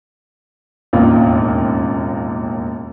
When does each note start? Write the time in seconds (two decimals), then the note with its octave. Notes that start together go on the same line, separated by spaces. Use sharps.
0.93 E1 A1 D#2 A#3 F4